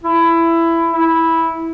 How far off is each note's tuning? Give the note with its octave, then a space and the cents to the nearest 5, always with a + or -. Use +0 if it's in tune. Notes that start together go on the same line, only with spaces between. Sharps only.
E4 +15
E4 -10